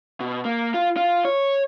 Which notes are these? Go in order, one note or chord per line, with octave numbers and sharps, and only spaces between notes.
B2
A#3
F4
F4
C#5